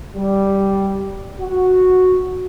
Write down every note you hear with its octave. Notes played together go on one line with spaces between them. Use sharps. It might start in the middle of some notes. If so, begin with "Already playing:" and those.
G3
F#4